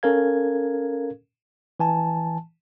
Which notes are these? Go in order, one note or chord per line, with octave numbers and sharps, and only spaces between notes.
C#4 A4 A#4 F5 G#6
E3 G#5 A5